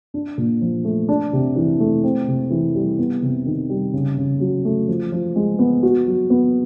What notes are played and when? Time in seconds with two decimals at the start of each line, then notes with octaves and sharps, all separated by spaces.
0.14 D4
0.38 A#2
0.61 F3
0.85 A3
1.09 D4
1.33 C3
1.56 E3
1.80 A3
2.04 C4
2.27 C3
2.50 E3
2.75 G3
2.98 B3
3.22 C3
3.46 D#3
3.69 G3
3.93 C#3
4.17 C#3
4.40 F#3
4.65 A3
4.88 F3
5.12 F3
5.36 G#3
5.59 B3
5.83 F#4
6.06 F#3
6.30 B3